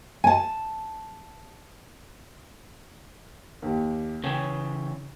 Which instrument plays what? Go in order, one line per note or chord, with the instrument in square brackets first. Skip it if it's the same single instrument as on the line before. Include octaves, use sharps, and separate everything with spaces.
[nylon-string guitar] G#5 A5
[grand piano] D#2 G4
[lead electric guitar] C#3 E3 [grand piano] C#5 G5